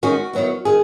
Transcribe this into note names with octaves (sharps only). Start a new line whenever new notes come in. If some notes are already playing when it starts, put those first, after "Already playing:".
D#3 G#3 C#4 F#4
D#3 F#3 B3 E4
D#3 G#4